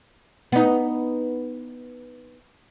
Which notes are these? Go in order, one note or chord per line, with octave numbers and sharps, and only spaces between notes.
B3 D#4